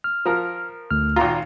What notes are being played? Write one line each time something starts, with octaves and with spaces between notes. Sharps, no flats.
F6
F3 A#4
D2 F6
G#1 A#2 F4 A#5